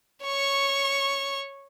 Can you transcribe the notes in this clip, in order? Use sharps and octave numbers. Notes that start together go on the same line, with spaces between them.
C#5 C#6